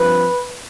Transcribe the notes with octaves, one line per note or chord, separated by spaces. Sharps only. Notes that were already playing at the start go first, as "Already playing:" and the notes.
Already playing: G2 F3 C4 B4